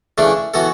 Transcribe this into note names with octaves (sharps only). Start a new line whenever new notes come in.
C#3 E3 A3 D4
E3 B3 F#4 A4